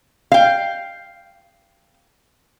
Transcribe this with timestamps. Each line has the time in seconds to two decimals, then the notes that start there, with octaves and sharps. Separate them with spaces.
0.32 F5 G5